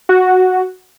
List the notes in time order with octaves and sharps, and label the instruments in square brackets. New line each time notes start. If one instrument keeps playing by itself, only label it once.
[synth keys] F#4